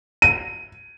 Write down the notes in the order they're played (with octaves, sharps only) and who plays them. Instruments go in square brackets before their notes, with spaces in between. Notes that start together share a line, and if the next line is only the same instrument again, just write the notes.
[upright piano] D#7